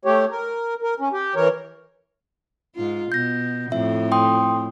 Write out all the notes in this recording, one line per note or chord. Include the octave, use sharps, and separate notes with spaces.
A3 G4 C#5
A#4
A#4
C#4
G4
E3 A#4 C#5
G#2 F4
B2 G6 A#6
F2 A2 E5
G5 C6 D#6